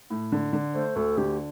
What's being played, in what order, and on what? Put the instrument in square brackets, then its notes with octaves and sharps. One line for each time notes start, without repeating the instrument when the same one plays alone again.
[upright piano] A2
D3
D3
[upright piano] A3 [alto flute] C5
[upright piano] D2 [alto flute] A4
[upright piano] D3 [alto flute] G4